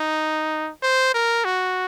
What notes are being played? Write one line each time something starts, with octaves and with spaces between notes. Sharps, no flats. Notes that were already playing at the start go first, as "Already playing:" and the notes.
Already playing: D#4
C5
A#4
F#4